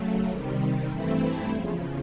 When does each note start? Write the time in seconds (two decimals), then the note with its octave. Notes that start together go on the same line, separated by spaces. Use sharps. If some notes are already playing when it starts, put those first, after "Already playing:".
Already playing: C#3 F#3 A3
0.28 C3 D#3 G3
0.89 G2 E3 A3 C4 E4
1.50 E2 C#3 F3